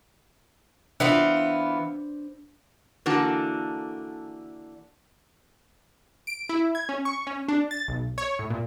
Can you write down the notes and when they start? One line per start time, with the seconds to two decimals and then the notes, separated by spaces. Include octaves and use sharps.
1.00 E3 B3 D4 F4 B4 C5
3.06 D3 E3 A#3 D4 F#4 A4
6.27 D7
6.49 E4
6.75 G#6
6.89 C#4
7.05 C#6
7.27 C#4
7.48 D4
7.71 A6
7.88 B1
8.18 C#5
8.39 A2
8.50 A#2